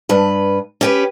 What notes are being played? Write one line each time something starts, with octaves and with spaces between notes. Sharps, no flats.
G2 B4
C#4 G4 B4